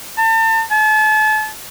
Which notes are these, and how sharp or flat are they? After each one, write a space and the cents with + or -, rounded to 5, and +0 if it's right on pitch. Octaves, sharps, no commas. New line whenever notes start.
A5 +35
A5 -35